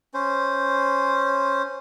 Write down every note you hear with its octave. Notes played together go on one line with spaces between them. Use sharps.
C#4 C5